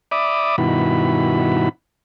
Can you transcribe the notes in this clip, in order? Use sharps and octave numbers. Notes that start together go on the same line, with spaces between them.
D5 E5 B5 D6 D#6
G2 B2 D#3 E4 F#4 B5